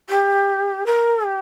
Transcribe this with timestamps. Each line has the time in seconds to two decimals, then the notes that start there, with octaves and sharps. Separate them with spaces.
0.09 G4
0.86 A#4
1.25 G4